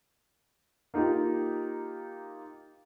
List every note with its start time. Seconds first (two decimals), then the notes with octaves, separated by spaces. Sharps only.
0.94 A#3 D#4 F4 G4